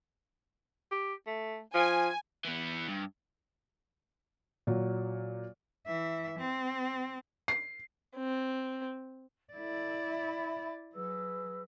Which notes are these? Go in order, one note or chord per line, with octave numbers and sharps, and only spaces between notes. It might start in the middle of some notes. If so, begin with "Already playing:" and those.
G4
A3
F3 G#5
E3 B3
G2
A#2 F#3
E3 E5
C4
C7
C4
E4 A4 D5
E5 B5
F#3 G#4 B4 E6